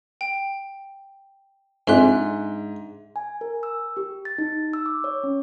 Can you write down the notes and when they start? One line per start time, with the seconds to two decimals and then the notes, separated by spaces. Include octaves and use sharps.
0.21 G5
1.88 F2 G#2 D4 G#4 E5 C6 F#6
3.16 G#5
3.41 A#4
3.63 E6
3.97 G4
4.25 A6
4.38 D#4
4.73 E6
4.86 D6
5.04 C#5
5.24 C#4